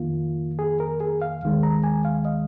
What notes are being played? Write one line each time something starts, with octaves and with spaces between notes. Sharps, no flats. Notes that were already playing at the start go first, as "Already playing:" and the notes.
Already playing: F2 D#3 A#3 F4
G#4
A#4
G#4
F5
D#2 D#3 G#3
A#5
G#5
F5
D#5